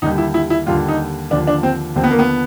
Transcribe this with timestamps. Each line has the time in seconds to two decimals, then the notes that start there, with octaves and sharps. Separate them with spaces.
0.02 D#2 D3 G3 D#4
0.18 E4
0.34 E4
0.50 E4
0.66 D#2 D3 G3 F4
0.88 D#4
1.31 D#2 D3 F3 D4
1.47 D4
1.63 C4
1.96 D#2 D3 F3 C4
2.04 B3
2.11 A#3
2.19 B3